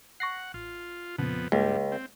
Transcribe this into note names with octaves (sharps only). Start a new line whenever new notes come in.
F#5 C#6 A#6 C7
A1 F4
F2 A#2 C#3 B3
C#2 G2 G#3 A#3
C4